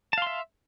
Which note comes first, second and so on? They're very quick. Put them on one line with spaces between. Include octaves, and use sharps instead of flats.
A5 F5 C6 E5